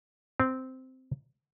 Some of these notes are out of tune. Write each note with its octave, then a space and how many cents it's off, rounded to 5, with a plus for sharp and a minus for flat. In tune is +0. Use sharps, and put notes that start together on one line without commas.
C4 -10